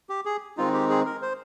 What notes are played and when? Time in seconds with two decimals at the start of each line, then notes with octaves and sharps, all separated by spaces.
0.09 G4
0.25 G#4
0.57 D#3 G#3 C4 D#4 F4
0.74 G4
0.90 G#4
1.05 A#4
1.22 C5